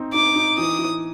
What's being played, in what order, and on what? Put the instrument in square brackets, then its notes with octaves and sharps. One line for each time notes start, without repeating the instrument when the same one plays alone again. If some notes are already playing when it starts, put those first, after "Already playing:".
Already playing: [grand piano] C4 D#4
[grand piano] D#4 [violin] D6
[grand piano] D#4
[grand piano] E3 [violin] D#6
[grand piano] E3